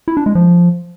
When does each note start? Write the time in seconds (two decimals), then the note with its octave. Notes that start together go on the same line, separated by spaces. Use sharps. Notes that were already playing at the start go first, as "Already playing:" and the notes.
0.08 E4
0.17 D4
0.26 G#3
0.35 F3